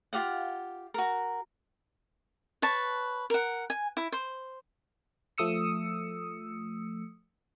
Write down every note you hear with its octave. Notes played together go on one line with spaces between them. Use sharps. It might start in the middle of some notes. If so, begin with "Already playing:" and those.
F4 G4 F5 F#5
F#4 A#4
B4 C#5 A5
A#4 F#5
G#5
E4
C5
F3 A3 D#6 E6 C#7